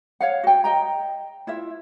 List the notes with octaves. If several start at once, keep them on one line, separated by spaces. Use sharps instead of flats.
C#5 F5 F#5
F#4 G5
D#5 G5 A#5
E4 F4 E5